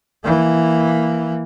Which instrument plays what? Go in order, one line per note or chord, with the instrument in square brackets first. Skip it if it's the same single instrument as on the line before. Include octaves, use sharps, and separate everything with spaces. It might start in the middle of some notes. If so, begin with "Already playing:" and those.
[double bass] E3 A#3